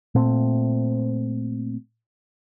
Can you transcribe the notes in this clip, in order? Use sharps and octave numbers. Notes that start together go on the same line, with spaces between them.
A#2 A3 C4